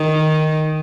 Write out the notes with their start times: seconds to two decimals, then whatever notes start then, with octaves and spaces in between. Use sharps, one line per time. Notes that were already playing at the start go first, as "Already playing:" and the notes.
Already playing: D#3